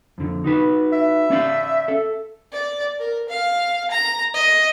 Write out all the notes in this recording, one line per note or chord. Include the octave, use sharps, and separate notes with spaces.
F2 D3
D#4 F#4 B4
E5
C#4 D5 F5
A4
D5
A#4
F5
A#5
D#5